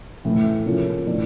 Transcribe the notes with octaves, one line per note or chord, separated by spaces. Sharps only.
A2 E3 A3 E4
C#3 F3 A#3 C#4
A2 E3 A#3 D4